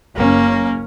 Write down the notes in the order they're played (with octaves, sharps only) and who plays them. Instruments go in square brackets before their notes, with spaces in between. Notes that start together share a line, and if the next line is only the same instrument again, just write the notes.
[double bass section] F#1 C#4 [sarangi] A#3